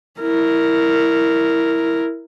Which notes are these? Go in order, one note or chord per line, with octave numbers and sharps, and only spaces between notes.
E4 A#4